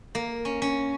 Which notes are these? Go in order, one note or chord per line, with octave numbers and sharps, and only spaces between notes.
A#3
C#4
C#4